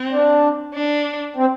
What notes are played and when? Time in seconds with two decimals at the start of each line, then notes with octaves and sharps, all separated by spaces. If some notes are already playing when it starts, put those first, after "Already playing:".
Already playing: C4
0.11 D4
0.73 D4
1.36 C4